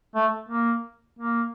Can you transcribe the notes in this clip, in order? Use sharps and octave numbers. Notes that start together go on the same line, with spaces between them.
A3
A#3
A#3